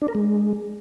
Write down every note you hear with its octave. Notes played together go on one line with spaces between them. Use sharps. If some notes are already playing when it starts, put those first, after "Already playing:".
D4
A#4
G#3